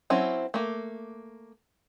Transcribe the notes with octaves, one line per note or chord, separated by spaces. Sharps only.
F#3 C4 C#4 E4
A3 A#3